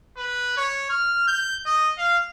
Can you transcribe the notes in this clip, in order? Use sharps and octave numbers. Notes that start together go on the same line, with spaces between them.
B4
C#5
F6
G6
D#5
F5